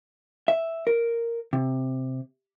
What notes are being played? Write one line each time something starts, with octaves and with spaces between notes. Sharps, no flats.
E5
A#4
C3